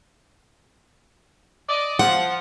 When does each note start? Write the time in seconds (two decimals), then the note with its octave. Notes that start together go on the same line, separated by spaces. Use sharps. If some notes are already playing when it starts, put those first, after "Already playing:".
1.68 D5 D#5
1.99 F3 F#5